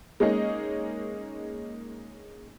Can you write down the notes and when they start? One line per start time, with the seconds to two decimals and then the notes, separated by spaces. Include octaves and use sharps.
0.20 G#3 A#3 C#4 D#4 G#4 D#5